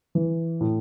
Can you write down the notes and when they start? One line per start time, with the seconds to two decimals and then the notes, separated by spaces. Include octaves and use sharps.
0.15 E3
0.61 A2